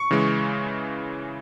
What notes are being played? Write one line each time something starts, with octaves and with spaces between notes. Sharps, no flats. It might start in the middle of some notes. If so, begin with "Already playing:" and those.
Already playing: C#6
C#3 E3 G#3